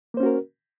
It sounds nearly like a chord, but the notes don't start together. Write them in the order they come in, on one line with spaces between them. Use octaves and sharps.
A#3 C5 C#4 F#4 A#4